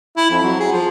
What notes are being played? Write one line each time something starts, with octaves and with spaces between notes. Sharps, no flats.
E4
F2
F#3
G#4
F3